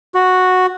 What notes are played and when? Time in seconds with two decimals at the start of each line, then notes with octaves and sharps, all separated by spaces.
0.15 F#4